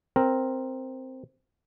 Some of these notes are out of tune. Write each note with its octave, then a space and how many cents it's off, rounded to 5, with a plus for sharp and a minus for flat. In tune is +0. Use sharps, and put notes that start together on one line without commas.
C4 +0 A#4 +0